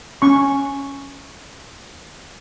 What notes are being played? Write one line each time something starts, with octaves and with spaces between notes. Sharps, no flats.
C#4 C#6